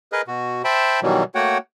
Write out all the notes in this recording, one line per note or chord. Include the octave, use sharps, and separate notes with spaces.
G#4 A#4 B4 D#5
B2 F#4
C5 E5 G5 A5 B5
B2 D#3 E3 F#3 G3
A3 A#3 F#4 C#5 F#5 G5